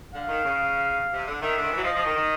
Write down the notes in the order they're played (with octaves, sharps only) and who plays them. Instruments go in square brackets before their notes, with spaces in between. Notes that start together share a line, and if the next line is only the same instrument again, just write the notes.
[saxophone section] D3 [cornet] F5
[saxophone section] D#3
C#3
C3
D3
[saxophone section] D#3 [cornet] E5
[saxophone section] D3
D#3
E3
F#3
[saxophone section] F3 [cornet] D#5
[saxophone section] F3
D#3
D#3